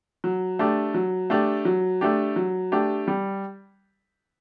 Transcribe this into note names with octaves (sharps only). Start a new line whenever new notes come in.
F#3
A3 D4 G4
F#3
A3 D4 G4
F#3
A3 D4 G4
F#3
A3 D4 G4
G3